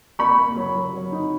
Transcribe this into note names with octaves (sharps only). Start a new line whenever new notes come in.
A#3 B5 C#6
A#3
F#3
F#3
F#3
D#4